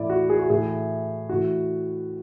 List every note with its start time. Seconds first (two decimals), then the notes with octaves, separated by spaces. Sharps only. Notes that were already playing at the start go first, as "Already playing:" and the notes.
Already playing: A2 E3 E4 D5
0.10 F#4
0.29 G#4
0.40 F#4
0.50 A2 E3 G#4
1.29 A2 E3 F#4